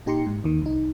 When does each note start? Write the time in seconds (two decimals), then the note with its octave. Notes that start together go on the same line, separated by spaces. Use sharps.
0.06 A#2 D#4 G4 A#5 C6 C#7
0.26 G#2
0.44 D#2 D#3
0.62 C2 D#4